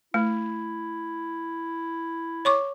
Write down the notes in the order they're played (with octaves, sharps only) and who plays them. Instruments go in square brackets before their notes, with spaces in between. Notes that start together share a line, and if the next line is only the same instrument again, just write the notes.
[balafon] A3 [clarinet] E4
[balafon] C#5 C#6 D6